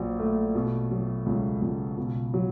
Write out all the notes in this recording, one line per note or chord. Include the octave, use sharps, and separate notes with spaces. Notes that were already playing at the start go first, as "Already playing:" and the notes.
Already playing: A#1 F#3
A3
B2
F#3
C#2
C#2
B2
F#3